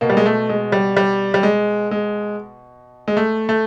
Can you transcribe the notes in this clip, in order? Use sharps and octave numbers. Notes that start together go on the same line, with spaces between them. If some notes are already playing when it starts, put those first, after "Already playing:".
B2 A#3
G3
G#3
A3
G#3
G3
G3
G3
G#3
G#3
G#3
A3
A3